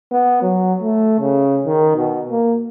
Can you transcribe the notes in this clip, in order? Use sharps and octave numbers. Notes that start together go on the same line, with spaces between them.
B3
F#3
A3
C#3
D#3
B2
A#3